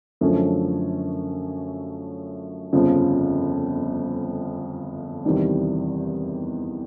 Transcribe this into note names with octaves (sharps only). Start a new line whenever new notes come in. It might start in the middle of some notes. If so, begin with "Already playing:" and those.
F#2 D3 F3 A3 C#4
G1 F2 C#3 F3
E2 C3 D#3 G3